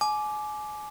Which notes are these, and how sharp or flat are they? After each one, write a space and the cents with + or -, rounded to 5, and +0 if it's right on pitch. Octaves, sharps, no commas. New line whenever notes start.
G#5 +30 D6 +0